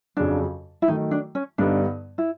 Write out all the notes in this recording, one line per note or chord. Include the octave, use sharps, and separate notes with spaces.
F2 C#3 F#3 D4
E4
D#3 F#3 A3 D#4
D4
C#4
G2 D3 G3 B3 D4 D#4
E4